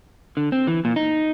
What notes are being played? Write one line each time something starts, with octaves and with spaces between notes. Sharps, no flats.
D3
C4
E3
A#2
D#4